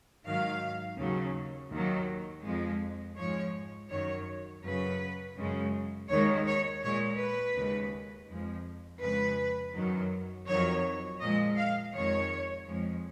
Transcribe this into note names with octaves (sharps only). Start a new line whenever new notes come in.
G#2 D#3 F#3 F5
D#2 C#3 F#3
D#2 D#3 F#3
F2 F3 G#3
G#2 F3 G#3 C#5
F#2 D#3 F#3 C#5
F#2 C#3 F#3 B4
F#2 C#3 G#3
D#2 D#3 G#3 C#5
C#5
A#2 G#3 C#5
B4
D#2 C#3 G#3
F2 F3 G#3
F2 C#3 G#3 B4
F#2 D#3 F#3
F2 D#3 F#3 C#5
A#2 F3 G#3 D#5
F5
F2 D#3 G#3 C#5
F2 F3 G#3